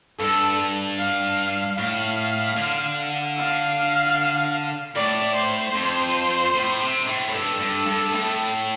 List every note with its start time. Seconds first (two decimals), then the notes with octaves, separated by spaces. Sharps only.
0.19 G2 A4
0.98 F5
1.78 A2 F5
2.57 D3
3.37 F5
4.95 A2 D5
5.35 C5
5.74 F2
6.54 A2
6.80 C3
6.97 G2
7.07 A2
7.28 A2
7.33 G2 A4
7.60 G2
7.86 G2
8.13 A2